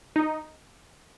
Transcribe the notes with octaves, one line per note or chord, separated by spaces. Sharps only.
D#4